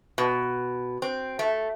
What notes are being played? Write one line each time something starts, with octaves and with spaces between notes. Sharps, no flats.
B2
C4
A3